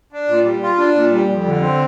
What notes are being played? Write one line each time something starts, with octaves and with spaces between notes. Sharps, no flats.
D4
A#2
G3
F4
D4
A#2
G3
F2
D3
C4